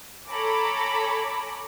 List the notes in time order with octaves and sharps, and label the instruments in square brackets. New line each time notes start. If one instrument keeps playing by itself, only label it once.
[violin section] A4 C#5 G#5 A#5 B5 D6